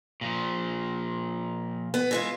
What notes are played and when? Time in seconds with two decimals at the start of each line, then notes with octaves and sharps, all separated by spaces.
0.21 A#2 F3
1.94 B3
2.11 E3 G#3 F4